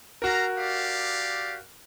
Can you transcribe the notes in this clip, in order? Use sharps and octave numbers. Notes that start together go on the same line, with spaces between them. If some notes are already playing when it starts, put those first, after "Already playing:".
F#4 A#4 F5 A#5
G4 D5 F5